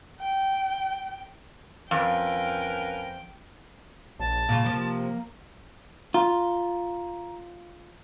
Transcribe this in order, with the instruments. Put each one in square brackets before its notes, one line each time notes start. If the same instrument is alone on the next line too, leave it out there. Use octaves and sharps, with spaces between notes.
[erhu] G5
[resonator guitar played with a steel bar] F2 [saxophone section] C#4 A#4 B4 [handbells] F5 [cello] G5
[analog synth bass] A#1 [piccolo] A5
[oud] A#2 C#3 F4 [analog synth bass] A#3
[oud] C3 F3
[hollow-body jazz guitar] F4 [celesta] A#5